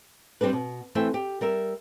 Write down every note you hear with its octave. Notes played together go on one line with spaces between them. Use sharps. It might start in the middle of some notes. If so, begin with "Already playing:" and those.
G3 C4 D4 B4
B2
E3 A3 C4 E5 G5
G4
G3 A#4 E5